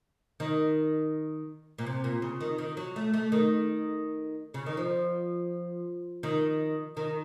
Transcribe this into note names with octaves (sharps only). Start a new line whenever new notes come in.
D#3
A#2
C3
A#2
C#3
D#3
D#3
F#3
A3
A3
D#3
C#3
D#3
F3
D#3
D#3